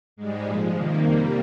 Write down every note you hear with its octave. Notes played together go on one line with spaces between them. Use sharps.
G#2 G3 G#3
A#2 F3 G#3
C3 D#3 G3 A#3
F2 C3 G3